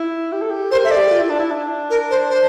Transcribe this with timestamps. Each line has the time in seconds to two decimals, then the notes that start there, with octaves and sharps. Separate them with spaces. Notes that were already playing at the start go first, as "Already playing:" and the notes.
Already playing: E4
0.32 G4
0.42 A4
0.51 G4
0.71 A#4 C5
0.85 A4 E5
0.91 D5
0.97 G4
1.11 F4
1.20 E4
1.30 D4
1.40 E4
1.51 D4
1.90 A#4
2.11 C5
2.30 C5